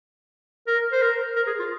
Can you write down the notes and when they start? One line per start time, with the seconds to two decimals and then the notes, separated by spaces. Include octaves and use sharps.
0.67 A#4
0.92 C5
1.02 A#4
1.36 A#4
1.47 G#4
1.59 F4